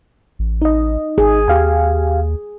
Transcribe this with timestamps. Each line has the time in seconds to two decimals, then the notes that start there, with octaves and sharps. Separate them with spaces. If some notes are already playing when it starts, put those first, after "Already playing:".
0.39 A1
0.62 D#4 D#5
1.18 G#1 G#4
1.48 D#2 G4 F5 G#5